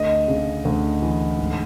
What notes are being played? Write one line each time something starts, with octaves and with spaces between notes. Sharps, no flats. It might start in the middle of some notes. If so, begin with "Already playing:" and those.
Already playing: D2 D#5
C#3
D2
E3
G#2